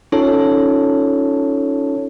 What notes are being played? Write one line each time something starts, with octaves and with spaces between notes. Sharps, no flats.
C#4 D#4 F4 A4 C#5 A5